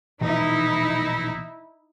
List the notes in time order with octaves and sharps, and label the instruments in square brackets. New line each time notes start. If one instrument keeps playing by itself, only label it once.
[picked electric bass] A#1 B2 E3 [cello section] D#4 E4